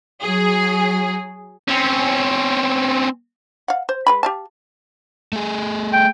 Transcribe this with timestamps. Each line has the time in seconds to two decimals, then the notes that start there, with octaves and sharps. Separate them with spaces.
0.22 F#3 G#4
1.68 C4 C#4
3.68 F5 F#5
3.89 C5
4.07 G#3 B4 B5
4.23 G4 F5 A5
5.33 A3 G#4
5.93 G5